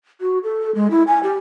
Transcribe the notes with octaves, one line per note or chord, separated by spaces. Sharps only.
F#4
A4
G#3
E4
G#5
G4